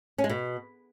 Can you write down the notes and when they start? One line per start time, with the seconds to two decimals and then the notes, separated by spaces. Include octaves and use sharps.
0.18 C#4
0.24 G#3
0.29 B2